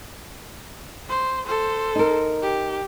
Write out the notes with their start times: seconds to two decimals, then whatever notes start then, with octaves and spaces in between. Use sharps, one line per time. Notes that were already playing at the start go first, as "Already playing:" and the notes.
1.09 C5
1.45 A4 C5
1.95 D#4 A#4
2.42 G4